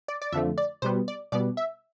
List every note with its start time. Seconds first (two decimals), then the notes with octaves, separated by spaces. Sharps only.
0.08 D5
0.22 D5
0.32 F2 D3 F3 A3 E5
0.58 D5
0.82 B2 G3 B3 C5
1.08 D5
1.32 B2 G3 B3 D5
1.57 E5